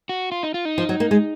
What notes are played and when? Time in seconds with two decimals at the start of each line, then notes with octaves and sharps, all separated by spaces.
0.09 F#4
0.32 F4
0.43 D#4
0.54 F4
0.65 D#4
0.78 F3
0.89 F#3
1.00 A#3
1.11 G#3